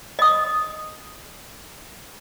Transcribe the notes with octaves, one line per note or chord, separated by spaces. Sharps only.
D#5 D#6